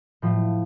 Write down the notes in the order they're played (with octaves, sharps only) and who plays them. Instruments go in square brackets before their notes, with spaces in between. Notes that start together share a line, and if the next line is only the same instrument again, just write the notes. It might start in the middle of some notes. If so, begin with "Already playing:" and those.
[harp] A2 F3 A3